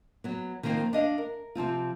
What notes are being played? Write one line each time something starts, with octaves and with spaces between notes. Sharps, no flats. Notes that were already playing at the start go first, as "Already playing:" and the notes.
F#3 B3
D#3 F3 A#3 C4 F4
D4 D#5 F5
A#4
C3 F3 C4 F4